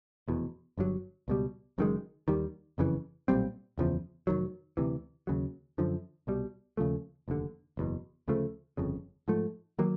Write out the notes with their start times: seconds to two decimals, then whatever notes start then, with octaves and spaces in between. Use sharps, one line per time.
0.28 F1 E2 B2
0.78 G1 G2 D3 F#3
1.28 C#2 B2 G3
1.78 F#1 F#2 D#3 G#3
2.28 D#2 D#3 G3
2.78 F#1 F2 C#3 E3
3.28 B1 A#2 G3 C4
3.78 F#1 E2 C#3 F3
4.27 F1 D#2 D#3 F#3
4.77 D2 C3 E3
5.27 D#2 C#3 F#3
5.78 F#2 D3 F3
6.27 C2 B2 G3
6.77 D#2 C#3 F3 A3
7.28 F1 D#2 D3
7.77 F#1 E2 B2
8.28 D2 C#3 F3 A3
8.77 G1 F2 C#3
9.28 G#2 F3 A3
9.79 D#3 F#3 A#3